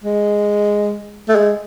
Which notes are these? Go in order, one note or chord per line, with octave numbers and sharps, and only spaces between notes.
G#3
A3
G#3